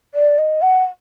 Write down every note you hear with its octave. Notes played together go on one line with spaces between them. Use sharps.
D5
D#5
F#5